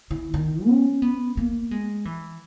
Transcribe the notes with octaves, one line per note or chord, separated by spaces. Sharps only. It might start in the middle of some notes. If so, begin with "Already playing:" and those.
E3
D#3
C#4
B3
A#3
G#3
E3